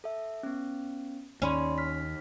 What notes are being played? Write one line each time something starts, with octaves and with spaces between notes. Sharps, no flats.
A4 E5
B3 C#4
D#2 C#4 D5 B5 C6
F6 B6